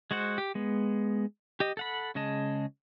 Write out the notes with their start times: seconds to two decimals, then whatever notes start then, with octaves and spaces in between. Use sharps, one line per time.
0.11 G#3 F#4 C5 F#5
0.38 G4
0.55 G#3 B3
1.60 G4 D#5
1.77 A4 F#5 B5
2.15 C#3 G#3 D#5 A5